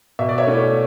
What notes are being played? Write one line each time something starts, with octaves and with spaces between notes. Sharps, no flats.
B2 E5
D5
C#5 E5
A3 C#4 E4